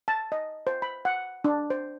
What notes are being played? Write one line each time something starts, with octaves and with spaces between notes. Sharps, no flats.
A5
D#5
C5
B5
F#5
D4
C5